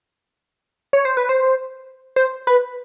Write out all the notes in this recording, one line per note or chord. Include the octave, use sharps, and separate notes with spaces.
C#5
C5
B4
C5
C5
B4